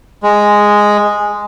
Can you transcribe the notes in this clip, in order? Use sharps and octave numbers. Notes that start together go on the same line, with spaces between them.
G#3